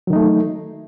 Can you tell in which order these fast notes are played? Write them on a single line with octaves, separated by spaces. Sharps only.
F#3 D#3 D#4 A3